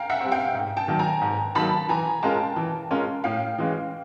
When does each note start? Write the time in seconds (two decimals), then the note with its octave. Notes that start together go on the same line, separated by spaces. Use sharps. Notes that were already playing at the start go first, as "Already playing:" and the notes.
Already playing: F5 G5 G#5 A#5
0.10 E5 F#5
0.21 G3 C4
0.32 F5 G5
0.55 G#2
0.77 G5 A5
0.88 D#3 F#3 A#3
0.99 G#5 A#5
1.21 G#2
1.55 D#3 F#3 A#3 A5 B5
1.89 E3 G#5 A#5
2.23 G#3 C#4 F4 A#4 G5 A5
2.56 E3
2.91 G#3 C#4 F4 A#4
3.24 A2 F5 G5
3.58 E3 G#3 C#4